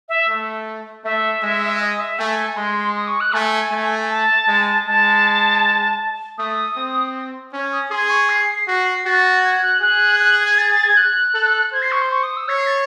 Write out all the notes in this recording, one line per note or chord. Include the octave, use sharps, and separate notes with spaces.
E5
A3
A3 E5
G#3
D#5
E5
A3 G#5
G#3 C6
D#6
C#6
F#6
A3 G#5
A3
A5
G#3
G#3 A5
A3 D#6
C4
C#4
D#6
G#4 C6
C#6
C7
F#4 C7
F#4 A6
G#6
F#6
G#4 F#6
F#6
G#6
A6
A6
G#6
F#6
A4
C5 G#6
C7
C#6
C6
C#6
D#6
E6
C#5 C#7
C7
A6